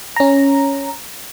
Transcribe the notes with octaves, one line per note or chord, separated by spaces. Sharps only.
C#4 A#5